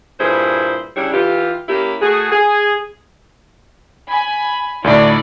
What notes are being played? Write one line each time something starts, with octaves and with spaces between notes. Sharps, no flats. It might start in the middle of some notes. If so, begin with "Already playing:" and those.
G2 A#2 E4 G#4 C5
C#3 G3 D4 E4 C#5
E3 F4 G4
A#3 C#4 E4 G4
A3 F#4 G#4
G#4
G#5 B5
D2 A2 D#4 E4 D5